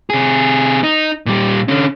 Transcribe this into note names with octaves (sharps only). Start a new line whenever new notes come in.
C3 G#4
D#4
A#2 G3
D3 C#4